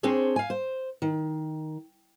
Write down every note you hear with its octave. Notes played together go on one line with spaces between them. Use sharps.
C4 D4 G#4 C5 C#5
F5 G#5
C5
D#3